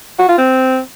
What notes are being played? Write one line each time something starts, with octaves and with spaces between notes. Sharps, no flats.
F#4
F4
C4